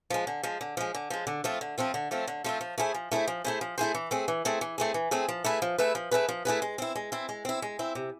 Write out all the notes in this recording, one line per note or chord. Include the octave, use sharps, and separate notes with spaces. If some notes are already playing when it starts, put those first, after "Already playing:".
F3 G#3
D3
F3 G#3
D3
F3 G#3
D3
F3 G#3
D3
F3 A3 C4 F4
D3
F3 A3 C4 F4
D3
F3 A3 C4 F4
D3
F3 A3 C4 F4
F3
A3 E4 G#4 C5
F3
A3 E4 G#4 C5
F3
A3 E4 G#4 C5
F3
A3 E4 G#4 C5
E3
A3 C4 G#4
E3
A3 C4 G#4
E3
A3 C4 G#4
E3
A3 C4 G#4
F3
A3 E4 G#4 B4
F3
A3 E4 G#4 B4
F3
A3 E4 G#4 B4
F3
A3 E4 G#4 B4
G#3
C4 E4
G#3
C4 E4
G#3
C4 E4
G#3
C4 E4
C3